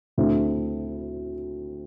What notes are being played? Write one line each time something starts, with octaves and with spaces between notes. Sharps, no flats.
D2 D3 A3 C4 E4